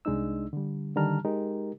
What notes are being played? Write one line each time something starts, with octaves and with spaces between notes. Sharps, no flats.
C2 G#3 D4 D#4 E6
D3 G3
D3 D#3 G3 A5 A#5 F6
G#3 D#4 G4 A#4